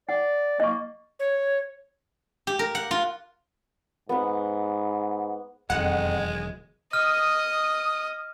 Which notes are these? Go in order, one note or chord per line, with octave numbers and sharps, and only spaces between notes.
D5 F#5
A#3 D#5 C#6
C#5
G4
A#4
F#5
F4
G#2 B3 F#5
E1 F2 D#3 F#3 G#3 F#5
D#5 D#6 F6